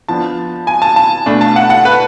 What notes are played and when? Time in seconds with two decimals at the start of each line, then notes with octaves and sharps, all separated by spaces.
0.08 F3 B3 D4 A5
0.67 G#5
0.82 A5
0.96 A5
1.26 B2 A3 D4
1.41 A5
1.56 F#5
1.70 F#5
1.85 B4